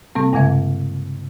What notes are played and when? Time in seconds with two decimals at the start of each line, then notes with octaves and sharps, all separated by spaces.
0.15 C3 G3 A#3 C4
0.33 G2 C#3 G#3 E5